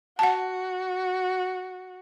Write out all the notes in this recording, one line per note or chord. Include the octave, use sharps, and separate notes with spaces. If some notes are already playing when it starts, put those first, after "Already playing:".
F#4 F#5 A5